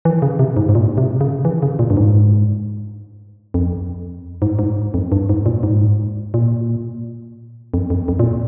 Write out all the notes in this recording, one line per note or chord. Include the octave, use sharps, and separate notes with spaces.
E3
C#3
C3
G#2
G#2
A#2
C3
C#3
E3
C#3
A#2
G2
G#2
F2
G#2
G#2
F2
G2
G#2
A#2
G#2
A#2
F2
F2
F2
A#2